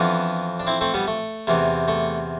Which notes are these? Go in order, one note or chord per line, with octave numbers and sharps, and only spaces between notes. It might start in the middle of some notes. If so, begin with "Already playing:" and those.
Already playing: F2 E3 B3 D4
D4
C4 E4
A3 C4
G3 B3
A3
E2 C3 E3
A3